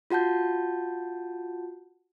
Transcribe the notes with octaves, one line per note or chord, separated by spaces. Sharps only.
F4 F#4 F#5 A5 G6